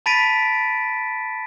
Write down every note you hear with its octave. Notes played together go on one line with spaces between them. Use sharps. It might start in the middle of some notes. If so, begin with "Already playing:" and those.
A5 B5 A6 B6 D7 D#7